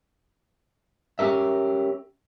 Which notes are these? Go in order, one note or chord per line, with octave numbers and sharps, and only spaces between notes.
C#4 G4 A#4 E5